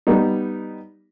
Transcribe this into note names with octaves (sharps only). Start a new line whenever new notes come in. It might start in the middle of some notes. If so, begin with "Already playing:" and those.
G3 B3 D#4